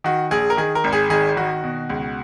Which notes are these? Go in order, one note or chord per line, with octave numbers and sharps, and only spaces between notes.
D#3 F#4
A#1 G#4
A#4
D#3 G#4
A#4
G#1
G#4
D#3 G#4
D#3 F#4
B2
C#2